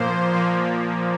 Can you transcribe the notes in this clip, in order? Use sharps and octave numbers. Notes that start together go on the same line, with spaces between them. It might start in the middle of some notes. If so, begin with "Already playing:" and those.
Already playing: A#2 F3 A#3 C5
A#2 F3 A#3